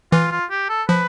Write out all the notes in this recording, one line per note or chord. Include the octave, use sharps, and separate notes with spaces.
E3 F4
F4
G4
A4
F3 B4